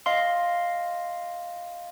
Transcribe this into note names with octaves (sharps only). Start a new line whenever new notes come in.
D#5 F5 C6